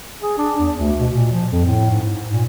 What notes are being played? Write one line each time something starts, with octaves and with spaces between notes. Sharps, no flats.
G#4
D4
E2
D2
B2
A#2
F3
F2
A2
G#2
G#2
A#2